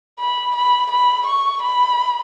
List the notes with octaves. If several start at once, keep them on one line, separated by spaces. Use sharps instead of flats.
B5
B5
B5
C#6
B5